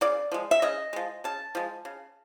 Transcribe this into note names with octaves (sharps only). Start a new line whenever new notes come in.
C#3 D5
F3 G#3
E5
C#3 D#5
F3 G#3
C#3 A5
F3 G#3
C#3